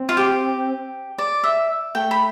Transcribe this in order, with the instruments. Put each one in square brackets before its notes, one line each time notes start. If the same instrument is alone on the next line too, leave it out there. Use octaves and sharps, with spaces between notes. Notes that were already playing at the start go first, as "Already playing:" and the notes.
Already playing: [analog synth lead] C4
[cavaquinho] F4
G4
D5
E5
[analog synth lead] A3 [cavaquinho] G5
[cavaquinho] B5